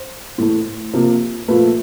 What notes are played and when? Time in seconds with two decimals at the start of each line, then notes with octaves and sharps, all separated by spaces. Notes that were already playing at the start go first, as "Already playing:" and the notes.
Already playing: C5
0.38 A2 E3 A3
0.93 C3 F3 A#3
1.48 A#2 F3 A3 B4